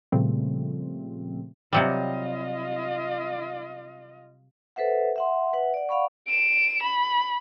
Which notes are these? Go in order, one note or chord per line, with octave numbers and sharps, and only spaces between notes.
A#2 C#3 F3 G3 A3 C4
C3 F#3 G3 F4 D#5
A4 B4 C5 E5 F#5
E5 F#5 C6
B4 E5 F#5
D5 F#5
D5 F5 F#5 B5 C#6
D7 E7
B5